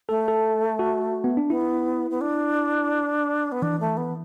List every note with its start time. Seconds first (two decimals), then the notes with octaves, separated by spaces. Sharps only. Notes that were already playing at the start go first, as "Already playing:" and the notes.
0.09 A3 A4
0.28 A4
0.79 F#4
1.24 B3
1.37 D4
1.50 B3 E4
2.10 B3
2.21 D4
3.52 B3
3.62 E3 D4
3.80 A3
3.97 B3